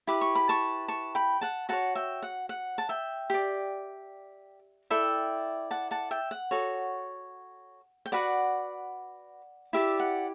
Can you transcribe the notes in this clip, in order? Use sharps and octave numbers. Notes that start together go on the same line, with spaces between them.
E4 G4 B4 D6
C#6
B5
A5 C#6
A5 C#6
G5 B5
F#5 A5
F#4 A4 C#5 F#5 A5
E5 G5
F#5
F#5
A5
E5 G5
G4 D5
E4 A4 D5 E5 G5
F#5 A5
F#5 A5
E5 G5
F#5
F#4 A4 C#5
G5
F#4 B4 D5 F#5
E4 G4 D5 E5
F#5